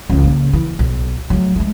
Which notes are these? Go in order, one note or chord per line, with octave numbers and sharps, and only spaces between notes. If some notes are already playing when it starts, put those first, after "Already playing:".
C#2 E3
C#3 A#3
E3
B1
F#3 A3
G#3 A3